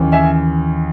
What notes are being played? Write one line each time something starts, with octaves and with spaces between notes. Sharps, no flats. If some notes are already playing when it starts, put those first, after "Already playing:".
Already playing: D#2 C#3 E3
E5 G#5